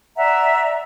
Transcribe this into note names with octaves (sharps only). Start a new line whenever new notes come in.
D5 E5 F#5 A#5